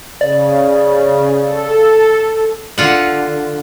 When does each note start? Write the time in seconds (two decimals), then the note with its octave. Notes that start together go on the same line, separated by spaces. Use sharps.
0.21 C#3 D5
1.45 A4
2.78 D3 F4 F#5